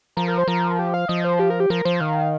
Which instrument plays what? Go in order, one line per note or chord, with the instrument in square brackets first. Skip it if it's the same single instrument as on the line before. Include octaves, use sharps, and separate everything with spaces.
[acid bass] F3 [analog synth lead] A#4
[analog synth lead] A#4
C5
[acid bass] F3 [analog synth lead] A#4
[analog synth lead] G4
F5
[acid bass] F3 [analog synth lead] D#5
[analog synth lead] C5
G4
A#4
G4
[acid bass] F3 [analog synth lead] A#4
[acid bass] F3 [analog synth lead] C5
[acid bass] D#3 [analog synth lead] F5